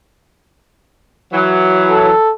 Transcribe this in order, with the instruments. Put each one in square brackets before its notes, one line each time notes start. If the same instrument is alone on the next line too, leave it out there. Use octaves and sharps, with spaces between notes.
[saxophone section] E3 F#3
[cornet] A4